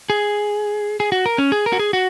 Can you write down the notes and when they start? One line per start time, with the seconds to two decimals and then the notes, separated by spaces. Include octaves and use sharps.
0.10 G#4
1.00 G#4
1.12 F#4
1.26 A#4
1.38 C#4
1.52 G#4
1.66 A#4
1.73 F#4
1.79 G#4
1.93 F#4